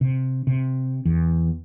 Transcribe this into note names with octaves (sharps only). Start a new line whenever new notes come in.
C3
C3
E2